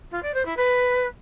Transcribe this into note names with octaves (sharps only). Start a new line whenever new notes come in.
F4
D5
C5
E4
B4